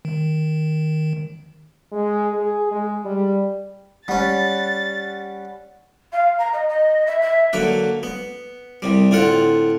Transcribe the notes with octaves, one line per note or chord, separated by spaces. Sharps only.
D#3
G#3
G#4
G#3
G3
G3 C#4 F#5 B5 A6
F5
A#5
D#5
D#5
E5
E5
D3 F#3 A#3 B4
B3
C2 C3 G3
A2 D3 C4 F4 F5 F#5